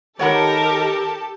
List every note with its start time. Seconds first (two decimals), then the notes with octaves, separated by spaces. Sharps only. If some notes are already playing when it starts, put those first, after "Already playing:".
0.19 D#3 G4 A4 A#4 C#5 F#5 A5 B5